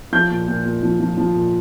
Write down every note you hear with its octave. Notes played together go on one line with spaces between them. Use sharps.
F3 G6
A#2
A#2
A#2
F3
F3
F3
A#2